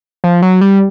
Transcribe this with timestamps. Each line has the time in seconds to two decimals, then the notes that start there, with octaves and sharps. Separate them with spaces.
0.24 F3
0.42 F#3
0.61 G3